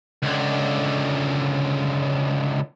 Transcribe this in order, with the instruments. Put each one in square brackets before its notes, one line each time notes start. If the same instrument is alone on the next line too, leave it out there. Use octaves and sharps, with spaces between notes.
[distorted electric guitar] C#2 D3